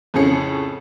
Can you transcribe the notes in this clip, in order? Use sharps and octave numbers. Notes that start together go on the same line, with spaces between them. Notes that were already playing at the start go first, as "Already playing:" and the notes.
F2 A2 C#3 C#4 G#4 C#7